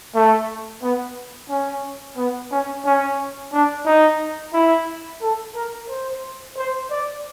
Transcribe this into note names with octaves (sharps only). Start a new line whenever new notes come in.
A3
B3
C#4
B3
C#4
C#4
D4
D#4
E4
A4
A#4
C5
C5
D5